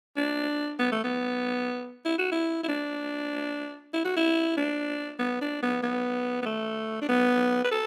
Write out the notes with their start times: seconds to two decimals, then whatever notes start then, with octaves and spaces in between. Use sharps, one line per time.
0.17 D4
0.79 B3
0.92 A3
1.04 B3
2.05 E4
2.18 F#4
2.32 E4
2.63 E4
2.68 D4
3.93 E4
4.05 F#4
4.17 E4
4.57 D4
5.19 B3
5.41 D4
5.62 B3
5.83 B3
6.42 B3
6.46 A3
7.01 D4
7.09 B3
7.64 B4
7.71 A4